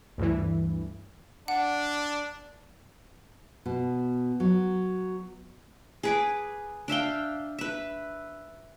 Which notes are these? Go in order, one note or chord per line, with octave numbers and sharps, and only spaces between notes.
D2 G2 E3
D4 F#5
B2
F#3
G#4 B4 D6
D4 E5 F5 G5
B4 E5